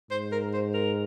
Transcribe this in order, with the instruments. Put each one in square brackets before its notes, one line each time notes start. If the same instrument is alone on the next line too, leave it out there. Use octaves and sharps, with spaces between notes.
[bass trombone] G#2 [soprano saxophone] C5
[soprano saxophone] A#4
C5
A#4